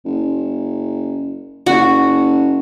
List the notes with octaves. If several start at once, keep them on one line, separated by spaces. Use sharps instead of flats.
F#1
F#1 F#4